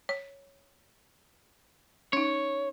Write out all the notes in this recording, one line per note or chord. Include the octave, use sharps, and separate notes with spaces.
C#5
C#4 D#4 C#5